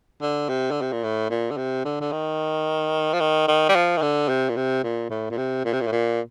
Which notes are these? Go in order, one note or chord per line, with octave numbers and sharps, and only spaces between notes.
D3
C3
D3
C3
A#2
A2
A#2
D3
C3
D3
D3
D#3
F3
D#3
D#3
G3
F3
D#3
D3
C3
A#2
C3
A#2
A2
A#2
C3
A#2
C3
A#2
A2
A#2